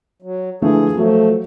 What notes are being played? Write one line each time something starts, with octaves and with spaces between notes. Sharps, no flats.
F#3
D3 E3 F3 A3 G#4
F3 F#3 A3